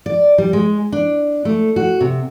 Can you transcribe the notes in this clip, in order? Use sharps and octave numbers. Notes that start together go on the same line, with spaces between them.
D5
G3
G#3
D4
A3
F#4
C3